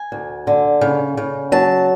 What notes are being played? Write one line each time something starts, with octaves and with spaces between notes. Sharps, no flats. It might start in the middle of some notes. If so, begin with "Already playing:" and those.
Already playing: G#5
D2
D3
C#3
C#3
F#3 A5